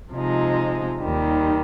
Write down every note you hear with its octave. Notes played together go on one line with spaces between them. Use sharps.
C3 F3 G#3 D#4
D#2 D#3 G3